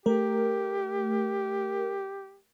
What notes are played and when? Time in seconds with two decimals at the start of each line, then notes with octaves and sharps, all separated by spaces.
0.06 A3 G4 A#4